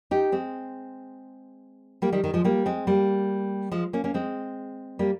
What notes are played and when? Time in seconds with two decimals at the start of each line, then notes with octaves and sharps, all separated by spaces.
0.11 D#4 G4
0.32 G#3 C4
2.02 G3 A#3
2.12 D#3 G3
2.24 D#3 G3
2.34 F3 G#3
2.44 G3 A#3
2.66 G#3 C4
2.87 G3 A#3
3.72 F3 G#3
3.93 A#3 C#4
4.04 A#3 C#4
4.14 G#3 C4
4.99 G3 A#3